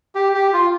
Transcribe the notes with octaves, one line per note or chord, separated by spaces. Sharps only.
G4
G4
F4